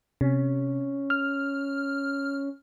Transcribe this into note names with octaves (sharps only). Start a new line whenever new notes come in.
C3 C#4
F6